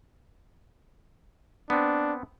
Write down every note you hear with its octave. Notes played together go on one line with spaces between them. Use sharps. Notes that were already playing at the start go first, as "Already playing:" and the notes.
B3 C4 D4